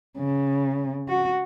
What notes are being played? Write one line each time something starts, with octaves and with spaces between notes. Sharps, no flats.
C#3
F#4